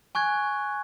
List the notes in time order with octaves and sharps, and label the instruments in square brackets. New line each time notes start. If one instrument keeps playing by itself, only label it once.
[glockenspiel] G#5 C#6 F#6 G#6